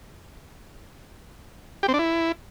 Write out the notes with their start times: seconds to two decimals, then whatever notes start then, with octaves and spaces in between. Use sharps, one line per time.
1.83 G4
1.88 C4
1.94 D4
1.99 E4